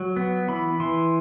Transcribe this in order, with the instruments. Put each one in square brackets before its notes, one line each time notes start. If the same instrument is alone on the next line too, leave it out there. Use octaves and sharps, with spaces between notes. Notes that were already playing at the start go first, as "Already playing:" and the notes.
Already playing: [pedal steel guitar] F#3
B3
E3 B5
E3 C6